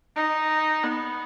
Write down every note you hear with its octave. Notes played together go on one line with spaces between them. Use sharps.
D#4
B3